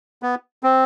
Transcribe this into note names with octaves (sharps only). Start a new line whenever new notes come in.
B3
C4